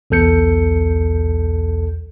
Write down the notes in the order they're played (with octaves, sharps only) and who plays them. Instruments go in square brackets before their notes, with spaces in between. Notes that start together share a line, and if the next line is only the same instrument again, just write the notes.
[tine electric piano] B1 E2 A4 G6 C#7